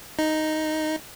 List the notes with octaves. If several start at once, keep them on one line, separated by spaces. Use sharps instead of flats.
D#4